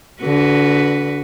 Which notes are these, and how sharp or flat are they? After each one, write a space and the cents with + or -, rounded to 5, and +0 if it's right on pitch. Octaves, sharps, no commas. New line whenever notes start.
D3 -30 F#4 +0 B4 +0